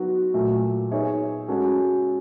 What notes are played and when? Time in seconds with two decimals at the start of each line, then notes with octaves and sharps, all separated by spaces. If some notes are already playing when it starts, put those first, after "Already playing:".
Already playing: F#3 B3 D#4 F#4
0.34 A#2 F#3 A3
0.91 B3 D#4 G#4 C#5 E5
1.48 G#3 C#4 F#4 A4